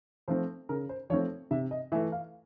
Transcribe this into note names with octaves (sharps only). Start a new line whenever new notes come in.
F3 A3 C4 C5
C#3 A#4
C5
F3 A3 C4 C#5
C3 E5
D#5
E3 A3 E5
F5